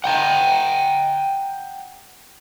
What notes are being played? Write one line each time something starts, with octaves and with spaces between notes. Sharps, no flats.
F#5 G5 A#5